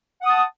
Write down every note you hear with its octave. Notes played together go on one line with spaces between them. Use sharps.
F#5 A5 D#6